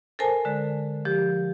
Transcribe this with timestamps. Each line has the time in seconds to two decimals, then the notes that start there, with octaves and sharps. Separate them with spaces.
0.19 A4 A#4 C5 G#5 A5
0.45 D3 G#3
1.05 F3 G4